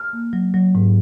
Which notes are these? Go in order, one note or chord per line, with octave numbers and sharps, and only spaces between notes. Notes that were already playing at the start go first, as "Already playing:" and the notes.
Already playing: F6
A#3
F#3
F#3
G#2